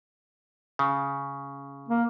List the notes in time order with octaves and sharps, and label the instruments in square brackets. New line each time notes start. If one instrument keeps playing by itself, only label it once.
[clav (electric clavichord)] C#3
[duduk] A#3